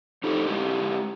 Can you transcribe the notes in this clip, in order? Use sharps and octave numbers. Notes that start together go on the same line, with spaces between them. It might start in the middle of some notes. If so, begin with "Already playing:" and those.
E2 D#4 G4 A4
G#3 E4 G4